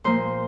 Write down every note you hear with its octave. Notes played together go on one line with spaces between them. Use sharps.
A#2 F3 A#3 C5